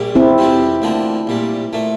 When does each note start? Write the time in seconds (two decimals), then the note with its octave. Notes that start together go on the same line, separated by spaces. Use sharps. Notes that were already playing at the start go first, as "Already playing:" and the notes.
Already playing: A#1 A#2 G3
0.15 C4 E4
0.38 F2 C3 E3 G3
0.82 D2 D3 F3 A#3
1.27 A#1 A#2 G3
1.73 A#2 A3